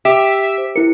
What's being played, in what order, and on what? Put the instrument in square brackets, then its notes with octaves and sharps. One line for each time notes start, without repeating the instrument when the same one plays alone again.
[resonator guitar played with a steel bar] G4 [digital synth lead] E5
[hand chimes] C5
[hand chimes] E4 A#4 [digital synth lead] C#7